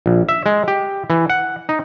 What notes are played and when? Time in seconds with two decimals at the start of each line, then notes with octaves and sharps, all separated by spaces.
0.06 A#1
0.29 E5
0.46 G#3
0.68 G4
1.10 E3
1.30 F#5
1.69 D#4